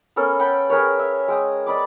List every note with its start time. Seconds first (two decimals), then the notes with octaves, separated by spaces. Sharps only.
0.16 B3 C#4 A4 A#4
0.39 F#5 G5 A5 B5
0.70 G#4 A#4 B4 C#5
0.99 E5
1.28 G#3 G5 D#6
1.66 D5 D#5 B5 D6